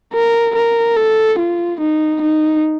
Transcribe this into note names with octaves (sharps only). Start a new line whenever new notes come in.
A#4
A#4
A4
F4
D#4
D#4